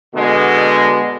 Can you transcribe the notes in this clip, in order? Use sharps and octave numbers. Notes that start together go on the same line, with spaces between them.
B2 D3 G#3